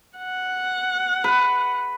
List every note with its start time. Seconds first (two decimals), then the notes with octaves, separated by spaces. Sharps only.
0.18 F#5
1.24 B4